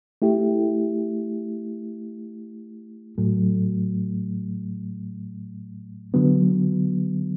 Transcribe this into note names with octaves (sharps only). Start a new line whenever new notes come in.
A3 E4 G4
A2 F#3 A3
D3 F#3 B3